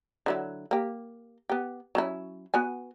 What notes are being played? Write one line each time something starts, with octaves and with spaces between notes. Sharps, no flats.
D3 F#3 E4
A#3 G4
B3 G4
F#3 C#4 E4
B3 F#4 G#5